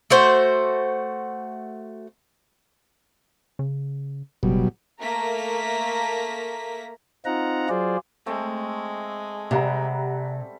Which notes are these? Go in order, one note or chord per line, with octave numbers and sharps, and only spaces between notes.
A3 F#4 C5
C#3
F#1 B2 F#3 G3
A3 A#3 A#5 B6
C4 D#4 F4 F#5 A#5
F#3 F4 G#4 C5 D5
G#3 A3 C4
C3 G3 G4 F#5 A#5